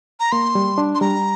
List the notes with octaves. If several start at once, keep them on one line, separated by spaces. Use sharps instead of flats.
A#5
A#3 C6
G3
D4
C6
G3 A#5